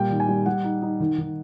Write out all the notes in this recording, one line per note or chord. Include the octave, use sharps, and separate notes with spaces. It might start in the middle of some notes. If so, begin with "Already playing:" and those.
Already playing: A#2 G3 G5
D#3
G#5
G3
G3 F#5
D#4
D#4
D#3
D#3